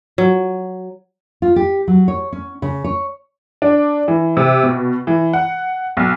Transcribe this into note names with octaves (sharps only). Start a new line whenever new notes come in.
F#3
F4
G4
F#3
C#5
C#4
C#3
C#5
D4
E3
C3
B2
E3
F#5
B1